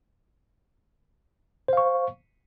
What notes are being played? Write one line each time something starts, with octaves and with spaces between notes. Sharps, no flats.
C5 F5 C#6